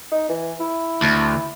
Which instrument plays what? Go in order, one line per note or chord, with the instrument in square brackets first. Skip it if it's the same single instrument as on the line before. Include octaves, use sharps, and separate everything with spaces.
[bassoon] D#4
E3
E4
[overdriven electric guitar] D2